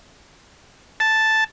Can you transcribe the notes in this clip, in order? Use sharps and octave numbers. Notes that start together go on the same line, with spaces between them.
A5